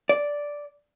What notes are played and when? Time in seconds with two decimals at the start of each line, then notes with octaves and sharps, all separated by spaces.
0.09 D5